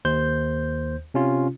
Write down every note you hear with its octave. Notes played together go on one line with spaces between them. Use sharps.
D#2 C5 G6
C3 C#4 F4